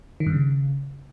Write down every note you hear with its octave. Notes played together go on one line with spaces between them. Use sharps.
D#3
G2
C#3